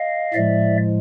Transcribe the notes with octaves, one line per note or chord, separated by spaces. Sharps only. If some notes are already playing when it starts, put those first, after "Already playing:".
Already playing: D#5 F5
A2 F3 G#3 D5 E5